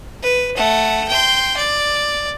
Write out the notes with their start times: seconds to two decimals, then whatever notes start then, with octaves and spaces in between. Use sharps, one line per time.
0.23 B4
0.57 A3 F#5
1.08 G5 C6
1.57 D5